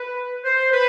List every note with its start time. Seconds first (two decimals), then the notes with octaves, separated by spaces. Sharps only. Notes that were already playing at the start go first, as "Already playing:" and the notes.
Already playing: B4
0.45 C5
0.72 B4